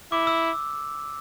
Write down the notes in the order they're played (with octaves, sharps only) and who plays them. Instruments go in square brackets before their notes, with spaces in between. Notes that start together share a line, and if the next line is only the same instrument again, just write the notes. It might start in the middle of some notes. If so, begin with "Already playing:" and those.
[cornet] E4 [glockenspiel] D6
[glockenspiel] E6